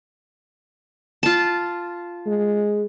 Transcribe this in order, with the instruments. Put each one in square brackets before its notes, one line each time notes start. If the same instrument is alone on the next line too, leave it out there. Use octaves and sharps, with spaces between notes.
[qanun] F4 A5
[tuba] G#3